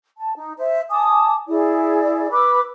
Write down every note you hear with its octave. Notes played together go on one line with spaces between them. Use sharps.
A5
D#4
C5 E5
G#5 A5 D6 D#6
E4 G#4 D5
B4 B5 D6 E6